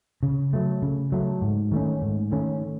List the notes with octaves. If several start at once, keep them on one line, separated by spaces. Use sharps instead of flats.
C#3
F#3 A3
C#3
F#3 A3
G#2
D#3 A3 C#4
G#2
D#3 A3 C#4